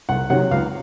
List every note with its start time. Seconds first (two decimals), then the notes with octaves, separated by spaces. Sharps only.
0.09 C2 F#5
0.30 C3 D#3 F#3 F#5
0.51 C#2 F5